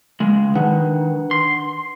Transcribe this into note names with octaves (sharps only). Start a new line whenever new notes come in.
C#2 C#3 G#3
D#3 D4 B4 F#5
C6